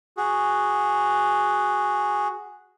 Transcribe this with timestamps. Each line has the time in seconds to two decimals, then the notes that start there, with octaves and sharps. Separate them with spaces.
0.17 F#4 G#4